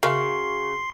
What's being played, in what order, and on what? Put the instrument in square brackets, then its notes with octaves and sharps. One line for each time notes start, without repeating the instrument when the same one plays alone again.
[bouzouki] C#3 [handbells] F#4 C#6 [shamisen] A#4 E5 F5 [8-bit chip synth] C6 C7